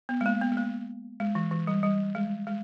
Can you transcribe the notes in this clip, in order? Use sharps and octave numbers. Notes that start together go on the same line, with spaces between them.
B3
G#3
A#3
B3
G#3
A#3
G#3
E3
E3
G3
G3
G#3
G#3